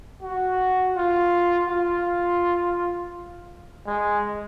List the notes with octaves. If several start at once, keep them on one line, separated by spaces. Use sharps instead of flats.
F#4
F4
F4
G#3